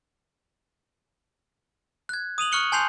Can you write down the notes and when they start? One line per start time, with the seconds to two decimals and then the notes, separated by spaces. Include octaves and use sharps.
2.09 F#6 G#6
2.38 D#6 D#7 F7 F#7
2.52 C#6 F6 F#6 C#7 F#7 G7
2.72 G#5 A5 C6 G6 C7 F7